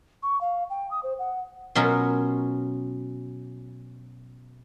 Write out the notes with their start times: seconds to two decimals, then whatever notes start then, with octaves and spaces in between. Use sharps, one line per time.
0.23 C#6
0.41 F5
0.70 G5
0.91 D#6
1.03 C5
1.19 F#5
1.75 B2 F#3 C#4 F4 A#4